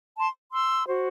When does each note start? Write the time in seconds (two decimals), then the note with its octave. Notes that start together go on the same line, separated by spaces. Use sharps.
0.17 A5 C6
0.52 C6 E6
0.87 F#4 C5